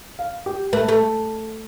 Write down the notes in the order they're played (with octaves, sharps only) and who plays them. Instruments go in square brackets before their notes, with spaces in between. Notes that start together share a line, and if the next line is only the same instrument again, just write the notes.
[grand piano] F5
G4
[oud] A3 [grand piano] B4
[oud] A3